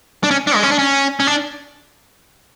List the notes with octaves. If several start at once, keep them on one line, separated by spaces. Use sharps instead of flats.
D4
C#4
D4
G#3
C#4
D4
C#4
C#4
D4